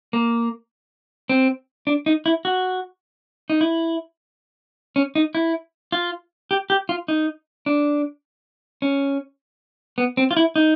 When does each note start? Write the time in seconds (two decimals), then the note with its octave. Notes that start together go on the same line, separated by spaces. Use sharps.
0.13 A#3
1.29 C4
1.87 D4
2.06 D#4
2.26 E4
2.45 F#4
3.50 D#4
3.61 E4
4.96 C#4
5.15 D#4
5.35 E4
5.92 F4
6.51 G4
6.70 G4
6.89 F4
7.08 D#4
7.66 D4
8.82 C#4
9.98 B3
10.17 C4
10.31 F4
10.37 E4
10.56 D#4